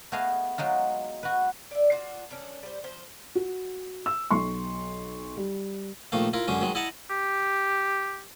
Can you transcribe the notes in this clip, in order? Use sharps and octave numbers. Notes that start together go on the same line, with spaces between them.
A3 B3 G#4 D#5 F5
F#3 G#3 D#4 F4
F#4 B4
D5 E5
D4 F4 F#4
D#3 C#4 D4 A4
G3 C5
F3 C5
F#4
E6
B1 C6 C#6
G3
A#1 D#3 A3 F5
E4 F4 A#4
F#2 D3 G#3 C#4
D#3 F#3 G#3
E4 D#5 F#5 A5 A#5
G4